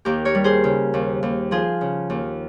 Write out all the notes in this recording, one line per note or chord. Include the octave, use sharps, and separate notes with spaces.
D#2 G4 A#4
A#4 C#5
G3
G#4 C5
C#3
D#2
D#2
F3 F4 G#4
C#3
D#2